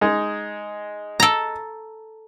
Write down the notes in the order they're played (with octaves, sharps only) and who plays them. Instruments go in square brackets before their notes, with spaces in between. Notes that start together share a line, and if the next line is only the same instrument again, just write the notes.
[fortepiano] G#3 D#4
[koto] A4 A#5